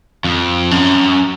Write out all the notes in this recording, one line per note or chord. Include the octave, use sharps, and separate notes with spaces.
F2
F#2